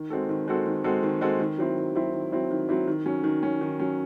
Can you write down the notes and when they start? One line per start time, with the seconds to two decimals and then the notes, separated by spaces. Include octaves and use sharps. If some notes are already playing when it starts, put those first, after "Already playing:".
Already playing: D#3
0.10 G#3 C4 F#4 A4
0.29 D#3
0.47 G#3 C4 F#4 A4
0.66 D#3
0.84 G#3 C4 F#4 A4
1.03 D#3
1.21 G#3 C4 F#4 A4
1.40 D#3
1.58 F#3 C4 E4
1.76 D#3
1.95 F#3 C4 E4
2.14 D#3
2.32 F#3 C4 E4
2.51 D#3
2.69 F#3 C4 E4
2.87 D#3
3.06 F#3 C#4
3.24 D#3
3.43 F#3 C#4
3.61 D#3
3.80 F#3 C#4